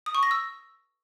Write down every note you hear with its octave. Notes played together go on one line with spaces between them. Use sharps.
D#6
C#6
A#6
E6